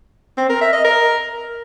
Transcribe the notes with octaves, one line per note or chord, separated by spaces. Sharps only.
C4
A#4
E5
D#5
A#4